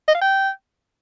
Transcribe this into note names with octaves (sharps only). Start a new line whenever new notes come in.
D#5
F5
G5